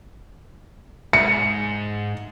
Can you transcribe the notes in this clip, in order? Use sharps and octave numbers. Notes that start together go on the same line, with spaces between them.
G#2 C#7